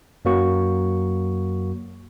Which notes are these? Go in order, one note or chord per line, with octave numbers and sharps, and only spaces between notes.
F#2 F#3 A#3 F#4 C#6